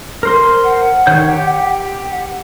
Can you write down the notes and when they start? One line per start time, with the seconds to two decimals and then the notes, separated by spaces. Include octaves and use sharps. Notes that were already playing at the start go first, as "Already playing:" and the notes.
0.23 A#4 C5 C6
0.64 F#5
1.07 D#3 C#5 G6
1.29 G4
2.11 F#5